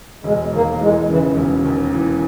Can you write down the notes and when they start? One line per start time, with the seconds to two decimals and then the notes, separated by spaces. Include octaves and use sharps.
0.24 E1 G#3
0.53 D#2 A#3
0.81 E3 G#3
1.09 C#3 E3
1.37 E1
1.65 D#2
1.93 E3